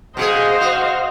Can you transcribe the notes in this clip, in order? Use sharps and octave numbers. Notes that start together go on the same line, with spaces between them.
B2 G4 G#4 C5 D#5 F5
F#4